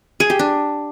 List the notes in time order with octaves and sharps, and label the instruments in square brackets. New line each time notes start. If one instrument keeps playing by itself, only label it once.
[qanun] G#4
G4
D4